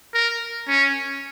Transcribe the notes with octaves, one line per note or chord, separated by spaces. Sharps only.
A#4
C#4